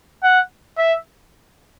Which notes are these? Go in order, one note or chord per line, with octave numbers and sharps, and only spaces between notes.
F#5
E5